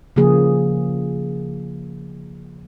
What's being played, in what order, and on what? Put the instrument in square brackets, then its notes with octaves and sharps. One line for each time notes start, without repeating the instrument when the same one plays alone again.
[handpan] C#3 F3 A#3 G#4